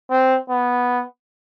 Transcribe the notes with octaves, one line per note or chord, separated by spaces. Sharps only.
C4
B3